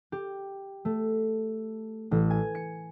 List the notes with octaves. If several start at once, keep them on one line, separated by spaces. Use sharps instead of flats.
G4
A3
A1
G#5
C#7